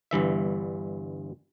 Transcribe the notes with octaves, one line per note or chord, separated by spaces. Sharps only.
G1 G2 E3 E5